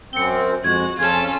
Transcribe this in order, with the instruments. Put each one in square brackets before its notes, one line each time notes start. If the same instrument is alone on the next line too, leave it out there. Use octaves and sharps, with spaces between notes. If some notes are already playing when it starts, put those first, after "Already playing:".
[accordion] F#2 C4 [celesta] C#7 G7
[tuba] F2 [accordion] G#3 [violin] F#4 [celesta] G#6
[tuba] F2 [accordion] C#4 [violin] F4 A4 [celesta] G#4 G#6